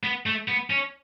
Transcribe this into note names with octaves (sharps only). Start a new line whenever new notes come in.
B3
A3
B3
C#4